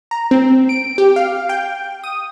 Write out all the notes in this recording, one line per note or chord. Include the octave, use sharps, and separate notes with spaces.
A#5
C4
D7
G4
F5
G5
D#6